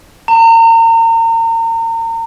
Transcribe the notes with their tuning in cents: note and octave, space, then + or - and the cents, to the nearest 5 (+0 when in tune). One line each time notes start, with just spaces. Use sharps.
A#5 -35